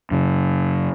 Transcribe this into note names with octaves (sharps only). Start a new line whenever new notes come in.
F#2 C#3